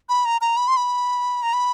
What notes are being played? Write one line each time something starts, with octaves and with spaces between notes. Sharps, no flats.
B5
A#5
A#5
B5
C6
B5
A#5
B5